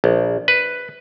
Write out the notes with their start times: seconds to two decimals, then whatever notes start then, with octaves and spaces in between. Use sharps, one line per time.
0.04 A#1
0.48 B4